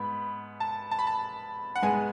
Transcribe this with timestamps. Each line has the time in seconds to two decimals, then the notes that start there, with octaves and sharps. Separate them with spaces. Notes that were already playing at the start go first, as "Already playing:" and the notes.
Already playing: G#2 B3 B5
0.60 A5
0.91 A5
0.99 B5
1.07 A5
1.76 F#5
1.82 G#2 G#3 B3 G#5